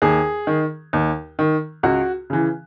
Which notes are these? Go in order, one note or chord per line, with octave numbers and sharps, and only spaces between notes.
D#2 G#4
D#3
D#2
D#3
C#2 F#4
C#3 E3